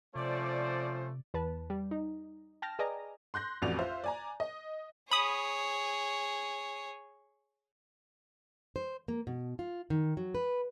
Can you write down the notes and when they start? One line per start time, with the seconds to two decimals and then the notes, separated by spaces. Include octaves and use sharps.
0.15 C3 F3 A3 C#4 C5 D5
1.34 E2 B4 A5
1.70 G3
1.91 D#4
2.62 G5 A5 F6 A#6
2.79 G#4 B4 D5 D#5 G#5 A#5
3.34 C6 F#6 G6 A#6
3.62 A1 F2 F#4 D5 F7
3.79 F4 C5 E5
4.04 D5 G#5 A#5
4.40 D#5
5.11 G#4 C#5 B5 D#6
8.76 C5
9.08 A#3
9.27 B2
9.59 F4
9.90 D#3
10.17 F#3
10.35 B4